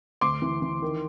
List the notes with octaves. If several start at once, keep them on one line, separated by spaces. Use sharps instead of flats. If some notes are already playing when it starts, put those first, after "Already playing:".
D2 C6 D6
E3
E3
D#3